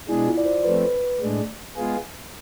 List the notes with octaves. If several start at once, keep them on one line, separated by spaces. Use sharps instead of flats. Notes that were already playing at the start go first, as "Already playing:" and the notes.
B2 G#3 D4 E4 G#4
F4
D5
C5
F3 A3 C4 B4
B4
A2 G#3 D4
G#3 B3 F4 G#4